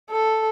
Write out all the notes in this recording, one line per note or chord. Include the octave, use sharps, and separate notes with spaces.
A4